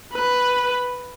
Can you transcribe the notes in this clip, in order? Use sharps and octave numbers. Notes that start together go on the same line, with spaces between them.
B4